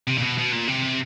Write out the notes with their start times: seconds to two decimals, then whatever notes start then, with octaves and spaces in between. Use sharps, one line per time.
0.08 C3
0.18 A#2
0.23 B2
0.38 B2
0.52 A#2
0.68 C3